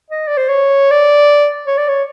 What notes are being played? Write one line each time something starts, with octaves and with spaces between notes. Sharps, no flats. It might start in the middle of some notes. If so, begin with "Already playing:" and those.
D#5
D5
C5
C#5
D5
C#5
D5
C#5